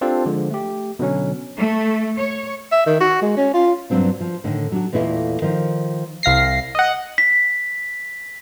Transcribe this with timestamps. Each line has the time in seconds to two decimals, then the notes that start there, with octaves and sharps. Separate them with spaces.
0.01 C4 D4 F4 G4 A4 C5
0.26 D3 F3 G#3
0.50 A3 G4
0.99 B2 D3 F#3 C#4
1.57 A3
2.18 C#5
2.72 E5
2.86 D#3
3.00 F#4
3.22 G#3
3.37 C#4
3.54 F4
3.90 G2 A#2 E3 F#3 C4 D4
4.20 F3
4.44 A2 D3 D#3
4.72 F#3 D4 F#4
4.92 E2 A#2 A3 E4 D#5 F5
5.42 D#3 F3
6.23 C2 F5 A#6 C7
6.75 D#5 F#5
7.18 B6